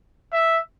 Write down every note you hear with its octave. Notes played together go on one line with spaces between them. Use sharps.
E5